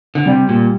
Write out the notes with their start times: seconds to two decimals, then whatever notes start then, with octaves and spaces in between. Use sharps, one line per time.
0.15 D3
0.25 C3 G3
0.49 A#2